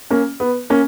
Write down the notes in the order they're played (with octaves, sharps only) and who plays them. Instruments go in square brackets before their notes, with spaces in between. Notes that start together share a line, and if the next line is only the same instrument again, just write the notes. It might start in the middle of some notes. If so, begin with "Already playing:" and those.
[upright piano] A#3 C#4
B3
A#3 C#4